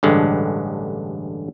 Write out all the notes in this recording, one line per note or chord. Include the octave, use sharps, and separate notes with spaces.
A1 G2 D3 G#3